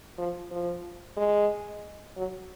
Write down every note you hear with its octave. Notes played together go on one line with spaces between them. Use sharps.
F3
F3
G#3
F#3